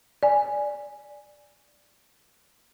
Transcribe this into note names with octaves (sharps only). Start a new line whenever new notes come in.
D5 G#5